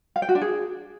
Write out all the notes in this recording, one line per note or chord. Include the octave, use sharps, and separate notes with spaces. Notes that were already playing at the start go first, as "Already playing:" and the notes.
F5
G5
F#4
D4
G#4